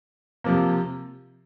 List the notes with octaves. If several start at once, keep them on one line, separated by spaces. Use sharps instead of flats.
C3 F3 A#3